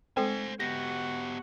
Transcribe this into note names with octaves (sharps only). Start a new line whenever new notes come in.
G#3 C4 A4 C5 G#5
B3 F#4 G4 F#5 A#6